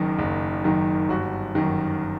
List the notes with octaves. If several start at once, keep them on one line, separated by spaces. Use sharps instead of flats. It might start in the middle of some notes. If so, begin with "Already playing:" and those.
Already playing: F#1 F#2 D#3
F#1
F#2 D#3
G1 F#4
F#2 D#3